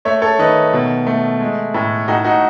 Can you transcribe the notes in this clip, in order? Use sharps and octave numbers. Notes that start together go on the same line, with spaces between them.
A3 C#5 E5
A4 C#5
D#3 B4 D#5
B2
A3
G#3
A2
A2 D#4 F#4
D#4 F#4